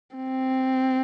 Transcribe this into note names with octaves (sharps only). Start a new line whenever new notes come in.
C4